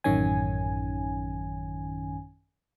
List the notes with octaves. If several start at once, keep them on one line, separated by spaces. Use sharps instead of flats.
A1 F#2 D#3 C#4 G#5